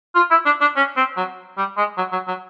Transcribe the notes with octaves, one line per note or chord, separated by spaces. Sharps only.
F4
E4
D4
D4
C#4
C4
F#3
G3
G#3
F#3
F#3
F#3